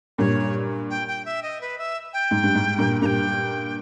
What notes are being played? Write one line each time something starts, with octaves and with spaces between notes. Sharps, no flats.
G2 A#2 C#5
G5
G5
E5
D#5
B4
E5
G5
G#2
G2
G#2
G2 A#2
G2 A#2 G5 A#5